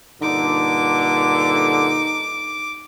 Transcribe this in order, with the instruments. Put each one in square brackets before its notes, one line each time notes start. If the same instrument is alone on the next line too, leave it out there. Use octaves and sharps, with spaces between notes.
[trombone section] G2 A#2 D3 [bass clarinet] D#4 [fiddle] D6